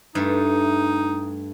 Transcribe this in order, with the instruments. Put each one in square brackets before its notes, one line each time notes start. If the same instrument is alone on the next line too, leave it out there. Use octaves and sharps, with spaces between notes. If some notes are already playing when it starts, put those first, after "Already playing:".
[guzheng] G2 A3 [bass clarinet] D#4